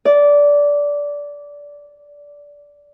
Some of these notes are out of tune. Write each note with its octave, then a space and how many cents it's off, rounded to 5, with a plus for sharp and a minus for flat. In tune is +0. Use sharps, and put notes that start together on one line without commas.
D5 -15